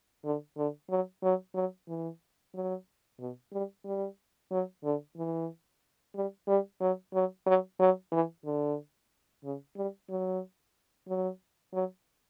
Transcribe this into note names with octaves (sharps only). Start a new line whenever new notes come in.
D3
D3
F#3
F#3
F#3
E3
F#3
B2
G3
G3
F#3
D3
E3
G3
G3
F#3
F#3
F#3
F#3
E3
D3
C#3
G3
F#3
F#3
F#3